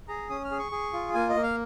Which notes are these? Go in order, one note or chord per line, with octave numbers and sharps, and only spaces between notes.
G#4 A#5
C#4 D#6
F6
G#4
C#6
G#4
F4
A#3 G#5
D#5
A#3
F5